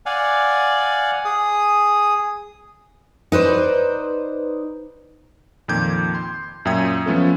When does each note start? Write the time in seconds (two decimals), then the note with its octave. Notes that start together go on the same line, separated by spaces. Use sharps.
0.06 D5 F5 F#5 G#5
1.25 G#4 D#6
3.32 D#4 B4 C5 D5
5.68 F2 A#2 D#3 D6 G6 G#6
6.15 C6
6.65 F#2 A#2 E5 G5 D#6 G#6
7.06 F3 A3 B3 C#4 F4 A4